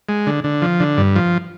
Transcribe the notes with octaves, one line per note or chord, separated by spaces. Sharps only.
G#3
D3
D3
F3
D3
G2
F3